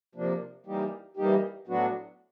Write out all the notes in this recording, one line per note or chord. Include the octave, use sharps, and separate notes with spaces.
C3 F3 A#3 D4
E3 G3 A#3 D#4 G4
E3 G3 A#3 D#4 G4
A2 F#3 B3 D4 F#4